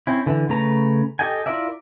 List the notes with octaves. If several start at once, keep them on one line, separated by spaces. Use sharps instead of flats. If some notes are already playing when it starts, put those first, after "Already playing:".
C4 C#4 E4
D3 E3
C#3 A3 B4 A#5
G4 A4 D#5 G5 G#5
E4 F4 A#4 D5 E5